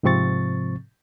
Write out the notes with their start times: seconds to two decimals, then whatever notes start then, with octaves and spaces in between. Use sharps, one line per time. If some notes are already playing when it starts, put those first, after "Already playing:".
0.03 G#2 C3 F3 C4 C#6 A6